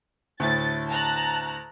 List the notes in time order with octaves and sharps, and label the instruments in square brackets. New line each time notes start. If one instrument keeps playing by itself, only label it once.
[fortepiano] D2 A2 [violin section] A6
[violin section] A5 A#5 F#6